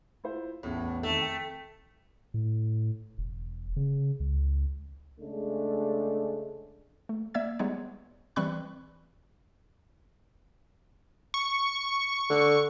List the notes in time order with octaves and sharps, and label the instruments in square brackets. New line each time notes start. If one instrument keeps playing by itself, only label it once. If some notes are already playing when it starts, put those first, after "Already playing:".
[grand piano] E4 F4 C5
[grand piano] A1 E2 [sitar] A2
[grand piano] F2 D#3 [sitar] A3
[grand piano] G5
[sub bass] A2
E1
C#3
C#2
[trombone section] C#3 G#3 A3 D4
[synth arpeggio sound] A3
A#3 D5 E5 E6 G#6
G3 G#3 B3 D#4 C#5
E3 G3 C4 B5 C#6 F#6
[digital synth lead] C#6
[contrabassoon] D3